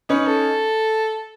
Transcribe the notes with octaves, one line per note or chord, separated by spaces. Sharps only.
C#4 D#4 B4
A4